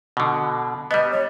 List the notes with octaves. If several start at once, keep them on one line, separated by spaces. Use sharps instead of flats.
B2 D3
G3 B3 D#5
C#5